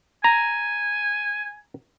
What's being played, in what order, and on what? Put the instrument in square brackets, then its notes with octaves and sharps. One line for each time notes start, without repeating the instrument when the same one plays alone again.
[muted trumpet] G#5 [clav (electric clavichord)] A#5